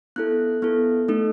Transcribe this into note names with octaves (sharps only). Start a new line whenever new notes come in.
B3 E4 A4 F#6
B3 E4 A4
A3 D#4 A4